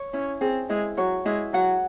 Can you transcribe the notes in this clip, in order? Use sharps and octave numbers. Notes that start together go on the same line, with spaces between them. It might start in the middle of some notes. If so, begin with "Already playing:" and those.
Already playing: C#5
C#4 E4
C4 G#4
G#3 E4
F#3 C#5
G#3 E4
F#3 F#5